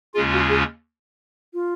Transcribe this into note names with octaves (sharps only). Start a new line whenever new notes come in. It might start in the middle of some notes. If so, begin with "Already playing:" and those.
D#2 C#3 G#3 C#4 F4 G#4
F#4
G#4
F4